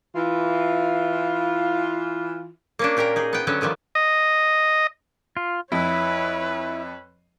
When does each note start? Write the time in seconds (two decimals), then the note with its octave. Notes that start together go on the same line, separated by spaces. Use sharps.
0.15 E3 F4
2.79 A#3 C#4 D4
2.97 A#2 G4 A#4 G5 A#5
3.16 D#4 G#4
3.33 B3 G5
3.47 D3 F#3 B3 C#4
3.61 D3 D#3 F3 G3
3.95 D#5
5.37 F4
5.72 F2 E4 B4 C#5